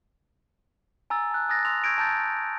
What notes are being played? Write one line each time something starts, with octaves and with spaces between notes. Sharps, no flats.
G#5 A#5 E6 A6
A5 F#6
G#5 D#6 F#6 A6 A#6
C6 D#6 E6 F7
C#6 E6 G6 G#6 A#6 D7
A5 A#5 E6 G6 A6